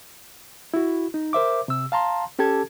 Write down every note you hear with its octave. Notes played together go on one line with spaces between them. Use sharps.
E4 F#4
D#4
A#4 C5 E5 D6
C3 E6
F5 A5 A#5 C6
C#4 G4 A4 A5 G#6